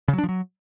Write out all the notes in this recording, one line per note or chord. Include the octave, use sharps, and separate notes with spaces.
C#3
F#3
D4
F3
F#3